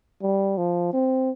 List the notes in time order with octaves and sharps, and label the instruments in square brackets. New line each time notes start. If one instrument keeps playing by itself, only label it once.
[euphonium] G3
F3
C4